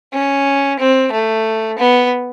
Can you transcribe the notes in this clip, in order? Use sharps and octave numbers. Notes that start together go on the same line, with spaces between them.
C#4
C4
A3
B3